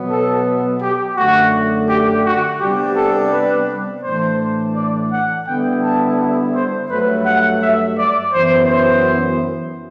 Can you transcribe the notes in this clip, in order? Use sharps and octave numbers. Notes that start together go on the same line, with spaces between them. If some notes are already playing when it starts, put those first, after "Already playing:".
Already playing: B2 F#3 B3
A4
G4
F#2 D3 A3 F#4
G4
F#4
C3 G3 B3 D4 G4
A4
B4
A2 E3 A3 D4 C5
D5
F#5
D3 G3 B3 E4 G5
A5
C5
G2 F#3 A3 B4
F#5
E5
D5
F#2 E3 B3 C5
C5